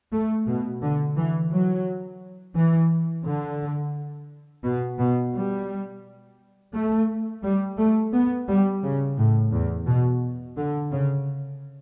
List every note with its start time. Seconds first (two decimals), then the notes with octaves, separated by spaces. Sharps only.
0.12 A3
0.47 B2
0.82 D3
1.17 E3
1.51 F#3
2.55 E3
3.25 D3
4.64 B2
4.99 B2
5.34 G3
6.73 A3
7.43 G3
7.78 A3
8.13 B3
8.48 G3
8.83 C#3
9.18 A2
9.52 E2
9.86 B2
10.57 D3
10.91 C#3